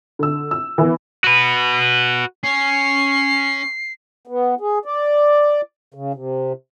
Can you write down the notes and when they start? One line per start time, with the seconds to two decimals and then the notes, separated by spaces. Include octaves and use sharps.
0.19 D3 E6
0.51 E6
0.78 E3 B3
1.24 F#4 B4
2.44 C#4 C7
4.27 B3
4.61 G#4
4.85 D5
5.94 C#3
6.14 C3